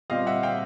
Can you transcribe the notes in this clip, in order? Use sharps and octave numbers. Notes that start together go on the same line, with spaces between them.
A#2 G3 C4 D#5 F5
E5 F#5
F5 G5